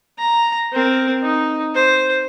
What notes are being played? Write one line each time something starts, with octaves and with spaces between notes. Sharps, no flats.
A#5
C4 A#4
D#4
C5